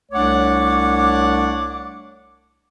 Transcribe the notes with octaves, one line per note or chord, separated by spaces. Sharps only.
C2 A3 D4 C#5 F#5 D6